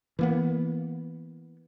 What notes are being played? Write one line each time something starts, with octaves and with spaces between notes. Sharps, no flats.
E3 A#3 B3